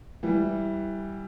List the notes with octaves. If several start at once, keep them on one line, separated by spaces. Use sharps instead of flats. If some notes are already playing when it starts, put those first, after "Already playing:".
E3 G3